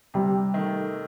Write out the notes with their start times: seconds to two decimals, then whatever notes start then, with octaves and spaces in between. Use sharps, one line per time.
0.14 C3 G3
0.54 D#3 A3